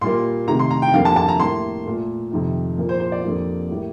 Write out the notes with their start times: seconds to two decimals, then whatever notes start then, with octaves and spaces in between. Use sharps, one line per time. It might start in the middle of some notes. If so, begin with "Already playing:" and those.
0.01 A#2 G3 A#3 C6
0.47 C3 D#3 A3 A#5
0.59 C6
0.70 A#5
0.82 G5
0.94 F2 D3 G3 A#3 F5
1.05 A5
1.16 A5
1.28 A#5
1.40 A2 G3 A#3 C6
1.86 A#2 A3
2.31 F2 C3 D#3
2.77 A#2 F3 A#3
2.89 C5
3.00 C5
3.12 D5
3.24 F2 D3 G3 A#3
3.69 A2 G3 A#3